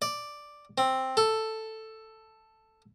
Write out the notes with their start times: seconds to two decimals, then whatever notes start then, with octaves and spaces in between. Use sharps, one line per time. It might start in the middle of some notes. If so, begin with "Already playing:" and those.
0.02 D5
0.78 C4
1.17 A4